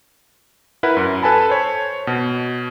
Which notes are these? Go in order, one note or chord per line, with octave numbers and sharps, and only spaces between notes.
E4 A#4 B4 F#5 B5
F#2
A4 B4 G#5 A5 B5
C5 C#5
B2